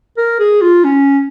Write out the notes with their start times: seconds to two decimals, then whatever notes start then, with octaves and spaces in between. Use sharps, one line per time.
0.17 A#4
0.39 G#4
0.61 F4
0.84 C#4